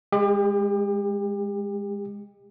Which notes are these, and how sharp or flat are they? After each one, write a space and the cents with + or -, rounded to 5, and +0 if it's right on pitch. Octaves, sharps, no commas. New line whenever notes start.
G#3 -15 G4 +35